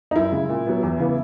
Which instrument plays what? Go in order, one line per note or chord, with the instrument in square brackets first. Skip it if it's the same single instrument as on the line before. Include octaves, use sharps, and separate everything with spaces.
[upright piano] D#4
F#2 E4
C#3 G#3
A#2
F#3 B3
E2
C#3 E3 B3